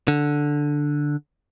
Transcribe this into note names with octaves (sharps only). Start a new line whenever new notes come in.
D3